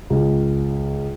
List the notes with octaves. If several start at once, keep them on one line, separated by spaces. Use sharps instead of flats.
C#2